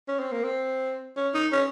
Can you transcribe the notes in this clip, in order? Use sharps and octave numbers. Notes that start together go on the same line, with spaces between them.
C#4
C4
A#3
C4
C#4
D#4
C#4